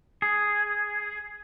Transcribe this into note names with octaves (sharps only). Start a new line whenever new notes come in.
G#4